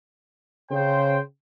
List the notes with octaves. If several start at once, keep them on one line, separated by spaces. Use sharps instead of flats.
C#3 C5 G5